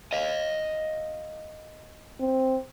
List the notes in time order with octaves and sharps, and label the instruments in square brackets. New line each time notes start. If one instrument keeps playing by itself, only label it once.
[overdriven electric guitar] D#5 F5
[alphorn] C4